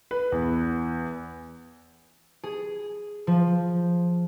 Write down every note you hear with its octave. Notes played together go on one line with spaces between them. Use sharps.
B4
E2
G#4
F3